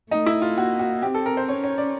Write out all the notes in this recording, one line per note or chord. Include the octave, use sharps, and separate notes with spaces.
A3 D#4
E4
F4
A#3 F#4
F#4
C4 G4
A4
A#4
C5
C#4 C#5
C#5
D5